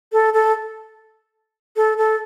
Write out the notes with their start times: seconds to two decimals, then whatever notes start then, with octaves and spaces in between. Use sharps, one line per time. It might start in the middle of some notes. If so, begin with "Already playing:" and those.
0.12 A4
0.34 A4
1.76 A4
1.98 A4